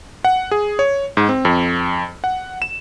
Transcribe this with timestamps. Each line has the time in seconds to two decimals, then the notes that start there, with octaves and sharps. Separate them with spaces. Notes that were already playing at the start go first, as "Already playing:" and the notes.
0.25 F#5
0.51 G#4
0.79 C#5
1.17 G#2
1.29 C4
1.45 F2
2.24 F#5
2.62 E7